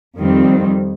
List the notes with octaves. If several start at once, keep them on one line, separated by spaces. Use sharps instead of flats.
F2 D#3 G3 C4